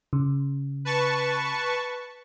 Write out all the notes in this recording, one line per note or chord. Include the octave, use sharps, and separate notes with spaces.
C#3
B4 A5 C#6